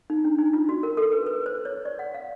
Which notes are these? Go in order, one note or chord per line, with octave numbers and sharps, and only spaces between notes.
D#4
D4
D#4
F4
F#4
A#4
A4
B4
B4
C5
C#5
D5
F#5
F5